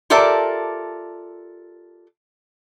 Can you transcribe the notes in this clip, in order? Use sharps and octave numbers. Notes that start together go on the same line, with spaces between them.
F4 G4 A4 A#4 D5 E5